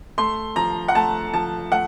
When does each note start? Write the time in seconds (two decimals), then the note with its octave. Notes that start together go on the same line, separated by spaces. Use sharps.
0.18 A3 C6
0.56 F3 A#5
0.88 F#5
0.95 A3 A5
1.34 F3 A5
1.72 A3 F#5